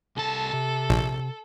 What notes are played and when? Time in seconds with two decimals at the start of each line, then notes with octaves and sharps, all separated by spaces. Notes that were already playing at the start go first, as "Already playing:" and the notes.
0.17 C2 A4 A5
0.53 C3
0.89 A#1